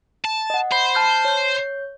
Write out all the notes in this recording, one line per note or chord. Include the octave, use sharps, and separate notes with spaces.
A5
D#5 F#5
C5 B5 C7
A5 F6 G6
C#5 G6